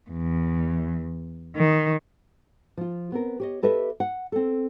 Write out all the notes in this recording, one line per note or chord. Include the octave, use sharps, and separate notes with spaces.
E2
D#3
F3 F4
B3 C4 A#4
G4 C#5 D#5
G4 A4 B4 D#5 E5
F#5
C4 A4